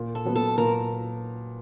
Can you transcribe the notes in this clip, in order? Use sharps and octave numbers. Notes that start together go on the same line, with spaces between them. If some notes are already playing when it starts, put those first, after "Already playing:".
Already playing: A#2
A4
F#3 B3
A4
A#2 A#4